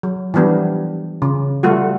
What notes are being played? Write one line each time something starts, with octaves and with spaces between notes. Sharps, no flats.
F#3
E3 F3 G3 B3 D4
C#3
G3 A3 F4 F#4